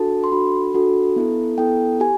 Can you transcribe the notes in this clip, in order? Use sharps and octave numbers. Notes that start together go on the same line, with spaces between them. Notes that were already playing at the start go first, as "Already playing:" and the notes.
Already playing: D4 F#4 A4 A5
C6
D4 F#4 A4 B5
D4 F#4 A4
B3 E4 A4
B3 E4 A4 G5
G4 G#5